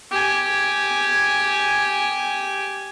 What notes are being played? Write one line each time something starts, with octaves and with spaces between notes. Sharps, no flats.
G4 G#5